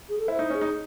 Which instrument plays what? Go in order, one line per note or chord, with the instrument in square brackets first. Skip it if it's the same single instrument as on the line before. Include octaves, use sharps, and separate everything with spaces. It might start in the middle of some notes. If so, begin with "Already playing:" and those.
[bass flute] G#4
A4
[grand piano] E4 [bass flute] C5
[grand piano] D#4
[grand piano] C#4 [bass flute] G#4
[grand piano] D#4